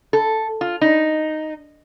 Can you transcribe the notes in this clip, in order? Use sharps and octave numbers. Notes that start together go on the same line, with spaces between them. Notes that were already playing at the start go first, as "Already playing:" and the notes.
A4
F4
D#4